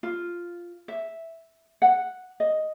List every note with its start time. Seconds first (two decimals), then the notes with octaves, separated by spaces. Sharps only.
0.03 F4
0.88 E5
1.82 F#5
2.40 D#5